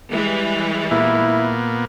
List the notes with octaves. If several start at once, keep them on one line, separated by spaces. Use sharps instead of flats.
E3 G3 G#3
A#2 A#3 B3 E4